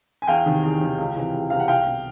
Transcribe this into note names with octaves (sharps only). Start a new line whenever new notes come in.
G#5
E2 F5 G5
C3 D#3
E2
C3 D#3
C#2
C3 E3
C#2
C3 E3 F5
F#5
C2 F5 G5
B2